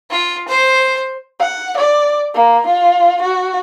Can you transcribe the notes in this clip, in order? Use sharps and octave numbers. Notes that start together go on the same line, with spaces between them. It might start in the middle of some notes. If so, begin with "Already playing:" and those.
F4
C5
F#5
D5
A#3
F4
F#4